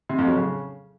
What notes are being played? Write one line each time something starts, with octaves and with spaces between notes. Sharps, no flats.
C3
F2
F#3
C#3